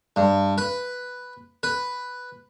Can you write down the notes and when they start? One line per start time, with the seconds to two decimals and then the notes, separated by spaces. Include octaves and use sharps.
0.16 G2
0.58 B4
1.63 B4